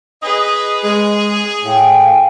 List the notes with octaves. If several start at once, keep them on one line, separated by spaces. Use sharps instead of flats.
G#4 B4 D#5
G#3 G#4
A2 F5 G5 G#5